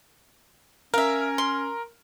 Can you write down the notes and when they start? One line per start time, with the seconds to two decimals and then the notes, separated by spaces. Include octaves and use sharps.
0.94 C#4 A#4 E5 F5
1.38 C6